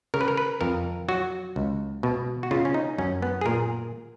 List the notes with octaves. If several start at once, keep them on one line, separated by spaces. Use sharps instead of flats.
C#3 A#4
B4
A#4
B4
F2 A#4
F#3 F#4
C#2
B2
F#4
C#3 F4
C#4
D#4
F#2 C#4
B3
G#4
A#2 A#4